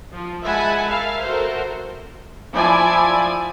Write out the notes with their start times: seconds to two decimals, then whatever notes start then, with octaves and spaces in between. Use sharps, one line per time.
0.13 F3
0.45 G#3 E5 F#5 G#5 A5 B5
0.86 A#4 E5 F5
1.25 F#4 A4 A#4 C5 E5
2.53 F3 E4 D5 G#5